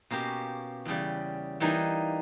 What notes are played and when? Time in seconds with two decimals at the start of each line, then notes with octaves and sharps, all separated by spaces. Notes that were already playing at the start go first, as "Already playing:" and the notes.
0.10 B2 A#3 C#4 G4
0.85 E2 C#3 G3
1.60 E3 G3 A#3 D#4